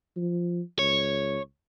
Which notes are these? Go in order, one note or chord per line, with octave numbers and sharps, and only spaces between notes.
F3
C#2 C#5